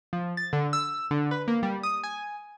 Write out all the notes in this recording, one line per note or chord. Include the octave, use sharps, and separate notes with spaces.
F3
A6
D3
E6
D3
B4
A#3
G3
D#6
G#5